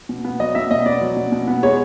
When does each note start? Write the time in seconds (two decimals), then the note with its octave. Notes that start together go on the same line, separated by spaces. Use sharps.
0.09 B2
0.25 B3
0.40 F#3 D#5
0.55 B2 E5
0.71 B2 D#5
0.86 B3 D5
1.01 F#3
1.17 B2
1.32 B2
1.48 B3
1.63 G#3 C#5